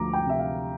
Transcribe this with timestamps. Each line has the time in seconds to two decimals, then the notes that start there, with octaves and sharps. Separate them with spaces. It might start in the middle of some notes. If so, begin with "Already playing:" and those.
Already playing: D2 F3 A#5 D6
0.13 G5
0.26 C3 E5
0.39 F5